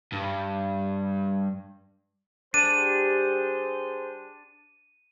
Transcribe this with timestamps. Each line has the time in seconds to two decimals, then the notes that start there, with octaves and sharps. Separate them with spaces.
0.13 G2
2.54 G3 D4 G4 G#4 C5 D#7